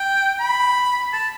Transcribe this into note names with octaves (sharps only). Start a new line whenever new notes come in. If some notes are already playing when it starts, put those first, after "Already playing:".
Already playing: G5
B5
A5